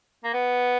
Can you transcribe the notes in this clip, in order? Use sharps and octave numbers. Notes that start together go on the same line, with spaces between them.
A#3
B3